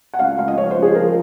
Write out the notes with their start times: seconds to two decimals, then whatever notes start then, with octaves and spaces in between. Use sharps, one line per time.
0.14 F#5
0.19 C#2 F5
0.38 C#2 F5
0.48 D#5
0.57 F3 C#5
0.71 C5
0.77 C#2
0.82 G#4
0.95 F3 A#4